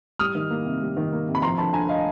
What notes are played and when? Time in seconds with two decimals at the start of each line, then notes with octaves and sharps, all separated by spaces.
0.19 G3 D#6 F6
0.35 D#3
0.50 A#3
0.65 C3
0.82 G3
0.97 D#3
1.12 A#3
1.28 C3
1.35 B5
1.42 F3 A#5 C6
1.58 D3 A5 B5
1.73 D2 G#5 A#5
1.89 D#5 F5